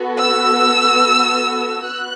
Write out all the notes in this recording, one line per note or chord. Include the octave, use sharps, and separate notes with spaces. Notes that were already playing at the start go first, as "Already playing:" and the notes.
Already playing: B3 F#4 A4
E6
B3 F#4 F#6